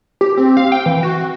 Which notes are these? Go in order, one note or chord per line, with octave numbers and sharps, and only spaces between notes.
G4
C4
F5
G5
E3
F#4